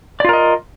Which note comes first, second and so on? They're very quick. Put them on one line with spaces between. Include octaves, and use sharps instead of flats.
D5 F4 A#4 D#5